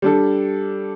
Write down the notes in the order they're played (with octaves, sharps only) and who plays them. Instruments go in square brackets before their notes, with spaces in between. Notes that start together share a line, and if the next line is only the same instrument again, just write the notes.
[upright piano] G3 D4 A4